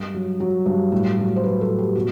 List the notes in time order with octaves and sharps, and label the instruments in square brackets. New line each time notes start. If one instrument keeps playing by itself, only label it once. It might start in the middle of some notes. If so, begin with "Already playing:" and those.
Already playing: [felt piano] G2
F#3
F#3
G2
A2
F#3
C5
F#3 B4
A4
A2
G4
B2 F#4